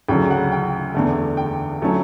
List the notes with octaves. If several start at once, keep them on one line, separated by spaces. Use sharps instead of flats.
D2 C#3 F#3 C#4 G5
F#5
G5
E2 D3 A3
G5
F#3 A3 C#4